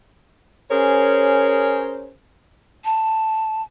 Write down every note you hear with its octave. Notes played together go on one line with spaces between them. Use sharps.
C#4 G#4 A#4 C5 C#5
A5